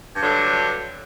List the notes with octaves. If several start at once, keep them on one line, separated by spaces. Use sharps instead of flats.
G2 D3 F#3